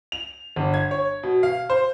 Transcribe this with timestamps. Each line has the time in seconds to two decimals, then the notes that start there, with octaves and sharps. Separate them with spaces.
0.12 F7
0.56 G1
0.74 G#6
0.91 C#5
1.23 B2
1.43 F5
1.70 C5